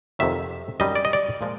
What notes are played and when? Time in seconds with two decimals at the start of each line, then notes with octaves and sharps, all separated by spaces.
0.19 F2 C3 D#3 F#3 E5
0.80 F#2 D#3 G3 D#5
0.95 D5
1.05 D#5
1.13 D5
1.41 A#2 F3 G#3